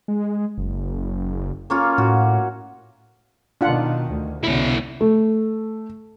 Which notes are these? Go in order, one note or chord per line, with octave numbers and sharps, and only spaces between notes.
G#3
F#1
A#3 C#4 F4
A2 F#4
B2 D#3 D4 F4 F#5
D2
C2 B2 D3 C#4 E4
A3